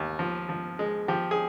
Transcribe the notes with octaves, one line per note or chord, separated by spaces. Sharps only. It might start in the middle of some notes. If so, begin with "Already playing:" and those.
Already playing: D#2
F3
F3
G#3
F3 G4
G#4